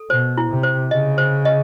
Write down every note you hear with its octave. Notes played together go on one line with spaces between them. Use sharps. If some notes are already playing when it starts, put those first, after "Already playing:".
Already playing: A4
B2 C5
E4
C3
C5
C#3 D#5
C5
D#5